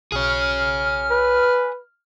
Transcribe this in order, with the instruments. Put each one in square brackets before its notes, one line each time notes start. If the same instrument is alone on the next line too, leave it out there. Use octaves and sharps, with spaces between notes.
[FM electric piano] B1 [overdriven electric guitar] G#4 C#5 [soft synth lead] F6
[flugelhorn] B4